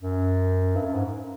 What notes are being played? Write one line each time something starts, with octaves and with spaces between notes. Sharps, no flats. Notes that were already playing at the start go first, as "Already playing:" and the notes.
F#2
G2
F#2
G#2